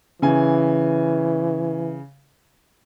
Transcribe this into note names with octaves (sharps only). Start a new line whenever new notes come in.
C#3 E3 G#5